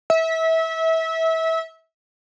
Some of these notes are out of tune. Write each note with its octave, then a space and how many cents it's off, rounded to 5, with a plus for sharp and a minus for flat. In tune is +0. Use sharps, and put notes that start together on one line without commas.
E5 -25